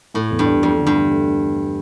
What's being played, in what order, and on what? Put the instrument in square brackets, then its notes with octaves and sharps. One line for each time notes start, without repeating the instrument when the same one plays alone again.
[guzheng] A2 [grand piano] A3
[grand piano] E2
[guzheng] G2
[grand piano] D4
[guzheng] F2 [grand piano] D4
[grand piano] D3
[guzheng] G2
[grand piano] A3
A3
D4